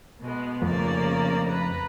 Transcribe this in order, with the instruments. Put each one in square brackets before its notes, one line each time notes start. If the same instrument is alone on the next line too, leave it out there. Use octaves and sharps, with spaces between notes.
[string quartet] B2 G#3 B3
[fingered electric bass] F2 F3 A3 [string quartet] C#3 A#3 D5
[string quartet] B4 A#5